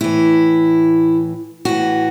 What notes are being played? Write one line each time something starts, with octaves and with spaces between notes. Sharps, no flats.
A2 E3 E4
A2 E3 F#4